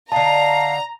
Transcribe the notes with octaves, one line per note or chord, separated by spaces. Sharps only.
D3 D#4 F5 A5 A#5